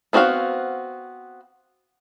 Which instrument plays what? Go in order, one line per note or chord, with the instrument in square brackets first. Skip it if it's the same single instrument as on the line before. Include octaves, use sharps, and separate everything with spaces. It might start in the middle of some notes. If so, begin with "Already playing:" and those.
[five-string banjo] B3 C4 F#4 D5 F5